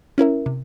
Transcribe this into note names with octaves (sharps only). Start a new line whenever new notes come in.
C#4 E4 A#4 E5
C3